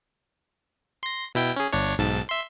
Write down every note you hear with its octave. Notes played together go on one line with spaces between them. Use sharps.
C6 A#6
B2 E4 G5
C#4 G#4
G1 D4 C#5
B1 G#2 A5
E5 C6